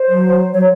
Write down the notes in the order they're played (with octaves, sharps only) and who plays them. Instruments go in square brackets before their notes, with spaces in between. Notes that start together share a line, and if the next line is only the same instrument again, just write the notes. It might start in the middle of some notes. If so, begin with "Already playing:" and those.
Already playing: [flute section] C5
[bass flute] F#3
[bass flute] F#3 [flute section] C#5